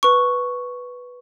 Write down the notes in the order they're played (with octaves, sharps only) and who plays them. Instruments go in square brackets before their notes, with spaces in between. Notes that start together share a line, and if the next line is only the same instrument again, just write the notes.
[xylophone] B4 C#6